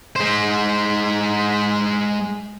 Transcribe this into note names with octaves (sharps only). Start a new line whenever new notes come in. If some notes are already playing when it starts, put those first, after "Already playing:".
G#3 C5